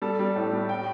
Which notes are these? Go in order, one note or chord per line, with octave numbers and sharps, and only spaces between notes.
G3 A4
G3
A2
G3
G5